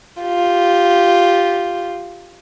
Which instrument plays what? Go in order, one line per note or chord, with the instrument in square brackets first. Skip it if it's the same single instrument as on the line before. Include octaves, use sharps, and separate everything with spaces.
[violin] F4 G4